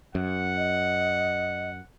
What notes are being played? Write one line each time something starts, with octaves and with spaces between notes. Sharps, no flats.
F#2 F#5
D#5